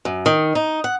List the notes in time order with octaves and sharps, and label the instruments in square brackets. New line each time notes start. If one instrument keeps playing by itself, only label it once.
[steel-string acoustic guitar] F#2
D#3
D#4
F#5